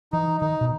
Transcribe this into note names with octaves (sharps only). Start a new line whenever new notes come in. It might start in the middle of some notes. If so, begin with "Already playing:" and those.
E3 D#4
D#3 D#4
B2